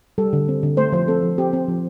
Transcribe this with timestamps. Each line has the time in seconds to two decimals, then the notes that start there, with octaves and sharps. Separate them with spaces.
0.18 G3 A4
0.33 D3
0.48 C4
0.63 D3
0.77 A3 C5
0.92 F3 C5
1.08 C4 A4
1.23 F3
1.38 C4 G4
1.53 C4
1.68 F3